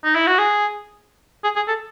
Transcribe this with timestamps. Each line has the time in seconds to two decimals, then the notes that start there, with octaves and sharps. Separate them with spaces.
0.04 D#4
0.15 E4
0.27 F#4
0.38 G#4
1.44 G#4
1.56 G#4
1.68 A4